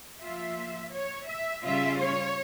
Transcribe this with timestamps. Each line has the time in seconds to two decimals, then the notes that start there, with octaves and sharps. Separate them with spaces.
0.22 F3 A#3 F4 E5
0.93 C#5
1.28 E5
1.63 C#3 G3 C#4 F4 E5
1.99 C#5